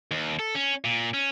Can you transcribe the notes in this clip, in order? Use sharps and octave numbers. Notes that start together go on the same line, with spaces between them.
D#2
A4
C#4
A#2
C#4